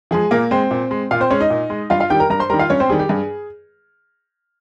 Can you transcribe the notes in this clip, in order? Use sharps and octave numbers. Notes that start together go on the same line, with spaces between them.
F3 G#3 G#4
A#2 A#3 A#4
G#3 C4 C5
A#2
G#3
A#2 F4 F5
C4 C5
G#3 C#4 C#5
D#4 D#5
A#2
G#3
G2 F4 F5
F4 F5
D#3 G3 G4 G5
A#4 A#5
G2 A#4 A#5
C5 C6
D#3 G3 A#4 A#5
F4 F5
G2 C#4 C#5
C4 C5
D#3 G3 G#4
G4
G2 G#4